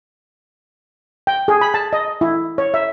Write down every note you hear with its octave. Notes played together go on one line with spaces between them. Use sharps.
G5
G#4
B5
A5
D#5
E4
C#5
E5